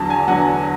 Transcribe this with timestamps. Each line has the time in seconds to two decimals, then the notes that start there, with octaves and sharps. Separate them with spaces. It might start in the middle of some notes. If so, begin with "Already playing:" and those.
Already playing: E2 D3 F#3 A5
0.10 G#5
0.28 E2 D3 F#3 F#5